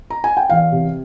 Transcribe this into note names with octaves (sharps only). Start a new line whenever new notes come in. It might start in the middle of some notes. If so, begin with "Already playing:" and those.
A#5
G#5
G5
E2 F5
C3